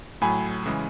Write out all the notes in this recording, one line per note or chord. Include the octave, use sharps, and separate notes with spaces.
A2 F#3 G#5 B5
C#3 E3 G#3